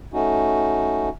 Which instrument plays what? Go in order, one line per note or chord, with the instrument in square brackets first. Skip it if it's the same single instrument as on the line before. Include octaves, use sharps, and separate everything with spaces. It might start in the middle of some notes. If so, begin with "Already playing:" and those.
[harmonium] A3 C#4 D#4 F#4